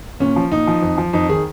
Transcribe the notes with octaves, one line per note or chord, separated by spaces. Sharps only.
A#2 C#4
F3
A#2 D#4
F3
F2
F3
F2 D#4
D#3 G#4